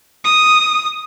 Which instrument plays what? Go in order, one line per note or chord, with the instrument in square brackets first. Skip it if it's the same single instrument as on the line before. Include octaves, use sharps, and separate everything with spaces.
[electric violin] D#6